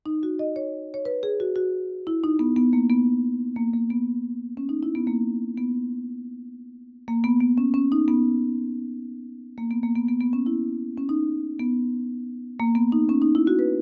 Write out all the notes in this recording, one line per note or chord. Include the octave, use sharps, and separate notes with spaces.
D#4
F#4
D#5
C#5
C#5
B4
G#4
F#4
F#4
E4
D#4
B3
B3
A#3
B3
A#3
A#3
B3
C#4
D#4
E4
B3
A#3
B3
A#3
B3
B3
C#4
C#4
D#4
B3
A#3
B3
A#3
B3
B3
B3
C#4
E4
C#4
D#4
B3
A#3
B3
D#4
C#4
D#4
E4
F#4
B4